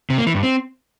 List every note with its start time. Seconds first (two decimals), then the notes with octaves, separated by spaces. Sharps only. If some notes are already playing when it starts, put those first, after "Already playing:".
0.10 C3
0.18 A#3
0.26 E3
0.35 G2
0.43 C4